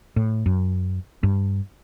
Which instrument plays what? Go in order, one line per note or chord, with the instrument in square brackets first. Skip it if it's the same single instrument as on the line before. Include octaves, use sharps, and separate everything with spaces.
[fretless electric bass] A2
F#2
G2